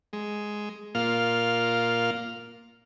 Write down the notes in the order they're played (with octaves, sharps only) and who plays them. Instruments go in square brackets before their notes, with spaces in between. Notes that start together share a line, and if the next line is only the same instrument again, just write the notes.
[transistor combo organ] G#3
A#2 A#3 F4 F6